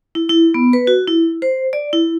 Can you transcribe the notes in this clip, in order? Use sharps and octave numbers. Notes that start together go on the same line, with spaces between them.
E4
E4
B3
B4
F#4
E4
C5
D5
E4